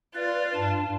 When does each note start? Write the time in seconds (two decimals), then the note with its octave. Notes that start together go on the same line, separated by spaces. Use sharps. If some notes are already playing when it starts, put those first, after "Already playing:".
0.15 F4 B4 D5
0.54 G2 A5